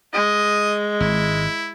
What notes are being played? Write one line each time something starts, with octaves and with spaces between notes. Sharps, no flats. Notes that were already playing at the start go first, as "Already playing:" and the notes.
G#3 D#5
G#1 E4